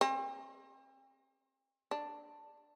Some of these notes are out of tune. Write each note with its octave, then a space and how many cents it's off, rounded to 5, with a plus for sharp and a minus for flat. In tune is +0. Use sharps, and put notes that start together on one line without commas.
C4 +40
D4 +5